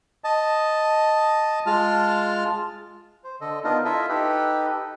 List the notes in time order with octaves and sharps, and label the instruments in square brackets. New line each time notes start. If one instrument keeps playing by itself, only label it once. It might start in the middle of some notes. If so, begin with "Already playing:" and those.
[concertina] D#5 A5
G#3 F4 A5 F6
[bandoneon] C5
D3 A4 D#5
B3 D4 D#4 F4 A#4 D#5
E4 F4 A4 D#5 E5
D#4 G4 A4 B4